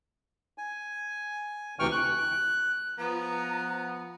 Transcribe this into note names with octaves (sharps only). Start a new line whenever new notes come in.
G#5
D2 C3 E3 G5 C#6 F6
F#6
F3 B3 A#5